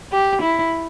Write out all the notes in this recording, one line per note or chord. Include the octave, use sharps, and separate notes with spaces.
G4
E4